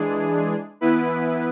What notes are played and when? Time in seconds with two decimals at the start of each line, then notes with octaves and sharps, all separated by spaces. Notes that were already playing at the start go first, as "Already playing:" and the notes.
Already playing: E3 G#3 D4 G#4
0.81 E3 B3 E4 B4